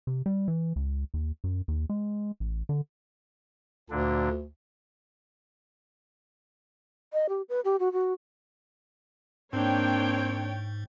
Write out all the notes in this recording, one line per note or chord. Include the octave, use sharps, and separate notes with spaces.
C3
G3
E3
C#2
D#2
F#2
D#2
G#3
A1
D3
D2 A#2 D3 D4
D#5
G4
B4
G4
F#4
F#4
G#2 A#3 C4 D4 C#5 G5